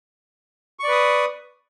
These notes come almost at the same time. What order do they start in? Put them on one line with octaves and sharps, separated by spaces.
C#6 D5 B4 D#6